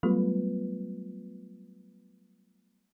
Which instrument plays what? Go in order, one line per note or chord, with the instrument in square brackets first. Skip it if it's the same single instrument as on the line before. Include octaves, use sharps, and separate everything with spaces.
[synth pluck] F#3 G3 A3 B3 F4 B4